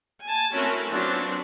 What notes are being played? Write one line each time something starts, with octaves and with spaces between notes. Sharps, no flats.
G#5 A5
A3 C4 C#4 E4 F#4 A#4
F#3 B3 C4 D4 F4 F#4